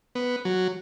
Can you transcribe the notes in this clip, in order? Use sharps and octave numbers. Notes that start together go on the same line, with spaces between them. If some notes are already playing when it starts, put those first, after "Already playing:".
B3
F#3